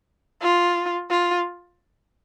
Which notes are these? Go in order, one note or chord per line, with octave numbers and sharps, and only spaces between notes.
F4
F4